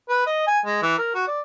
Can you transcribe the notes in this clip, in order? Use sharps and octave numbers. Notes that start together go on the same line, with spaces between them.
B4
D#5
G#5
G#3
E3
A#4
F#4
D5